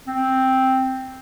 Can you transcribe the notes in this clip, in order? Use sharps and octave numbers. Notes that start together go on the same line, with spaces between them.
C4